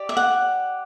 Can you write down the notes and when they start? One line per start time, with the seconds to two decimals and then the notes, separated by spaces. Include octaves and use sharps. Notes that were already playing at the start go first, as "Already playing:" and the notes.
Already playing: G4 D5
0.09 E5
0.17 F#5